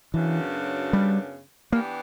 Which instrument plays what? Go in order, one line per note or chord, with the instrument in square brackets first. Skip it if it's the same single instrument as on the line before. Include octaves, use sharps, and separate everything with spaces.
[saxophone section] F#2 C#3 F#3 B3 D4 [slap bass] E3
[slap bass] G3
[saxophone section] E3 B3 D4 G4 [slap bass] A#3